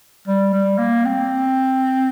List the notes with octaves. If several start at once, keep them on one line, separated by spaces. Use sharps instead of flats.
G3
G3
A#3
C4